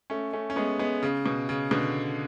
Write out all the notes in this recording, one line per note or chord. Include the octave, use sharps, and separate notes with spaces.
A3 C#4
A3 C#4
C#4
G#3 B3
G#3 B3
C#3
B2
C#3
B2 D3